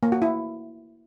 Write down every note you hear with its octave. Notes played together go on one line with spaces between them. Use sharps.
A#3
F#4
E4